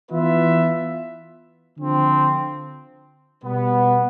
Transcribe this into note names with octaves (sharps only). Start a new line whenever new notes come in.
E3 B3 F4 B4 E5
D3 F3 C4
B2 G3 B3